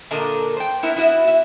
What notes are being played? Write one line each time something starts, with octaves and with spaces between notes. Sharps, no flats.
A#2 D3 A#3 A4 A#4 D#5
C5 G5
B3 E4 A#4
B3 E4 F#4 E5
E5